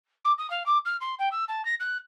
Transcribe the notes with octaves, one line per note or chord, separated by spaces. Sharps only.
D6
D#6
F5
D6
F6
C6
G5
E6
A5
A#6
F#6